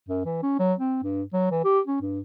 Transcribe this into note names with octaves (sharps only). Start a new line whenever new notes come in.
F#2
E3
C#4
F#3
C4
G2
F#3
E3
G4
C#4
G2